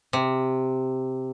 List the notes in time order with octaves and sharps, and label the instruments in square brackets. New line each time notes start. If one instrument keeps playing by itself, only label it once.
[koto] C3